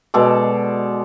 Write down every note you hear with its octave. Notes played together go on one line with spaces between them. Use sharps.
B2 G#3 A4 D5